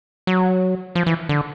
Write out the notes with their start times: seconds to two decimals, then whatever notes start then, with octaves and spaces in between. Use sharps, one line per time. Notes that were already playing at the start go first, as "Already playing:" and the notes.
0.27 F#3
0.95 F3
1.06 E3
1.29 D3